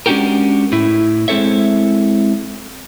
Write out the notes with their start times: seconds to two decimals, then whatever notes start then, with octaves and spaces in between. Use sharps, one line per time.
0.06 G#3 C#4 D4 F#4 G4 A#4
0.72 A2 E4
1.28 G#3 C4 E4 A4 C#5 E5